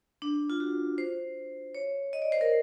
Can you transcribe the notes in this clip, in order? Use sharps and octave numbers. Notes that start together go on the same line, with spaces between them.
D4
F4
F#4
C5
C#5
D#5
D5
C5
A#4